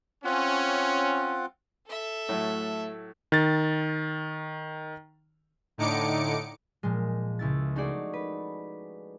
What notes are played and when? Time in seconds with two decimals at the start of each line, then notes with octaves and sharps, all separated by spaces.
0.24 C4 C#4 F4 F#5
1.87 A4 E5
2.29 A2 F#3 A3
3.32 D#3 A6
5.78 A2 D3 D#4 D6 C#7 D7
6.83 A#2 F3 G#3
7.39 C#2 E4 A6
7.76 A3 D#4 F#4 G#4 D5
8.13 B4